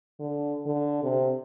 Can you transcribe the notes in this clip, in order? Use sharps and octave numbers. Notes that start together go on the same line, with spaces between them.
D3
D3
C3